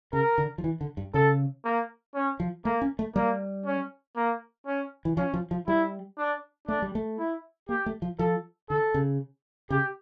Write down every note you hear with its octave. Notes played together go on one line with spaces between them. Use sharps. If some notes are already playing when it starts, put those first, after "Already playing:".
C#3 A#4
D3
F3
E3
D3
G2
C#3 A4
A#3
C#4
F3
A3 A#3
C#4
A3
G3 A#3
C#4
A#3
C#4
E3
F3 C#4
F3
F3
G3 E4
D4
A3 D4
G3
A3
E4
A#3 G4
A3
F3
F3 A4
D3 A4
C#3
C#3 G4